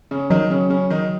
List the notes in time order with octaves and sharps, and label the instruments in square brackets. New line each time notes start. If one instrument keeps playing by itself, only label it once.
[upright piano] C#3 C#4
[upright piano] D#3 D#4 [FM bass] F#3
[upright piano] C#3 C#4
C#3 C#4
D#3 D#4